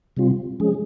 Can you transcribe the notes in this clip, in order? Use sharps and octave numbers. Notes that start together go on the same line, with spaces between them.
C3 G3 C4 F4
F3 G#3 C#4 G#4